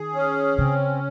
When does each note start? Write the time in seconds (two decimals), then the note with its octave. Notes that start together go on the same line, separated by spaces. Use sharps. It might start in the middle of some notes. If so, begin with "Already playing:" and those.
Already playing: D#3 G#4
0.14 C#4
0.58 C#3 C4